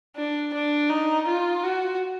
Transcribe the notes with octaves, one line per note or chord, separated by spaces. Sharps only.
D4
D4
D#4
F4
F#4